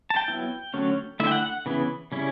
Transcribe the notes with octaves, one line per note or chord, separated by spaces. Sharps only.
A5
G5
F#3 B3 E4
D3 F#3 A3 C#4
D3 A3 E4 E5
G5
F#5
F#5
C#3 E3 B3 E4
C#3 G3 C#4 E4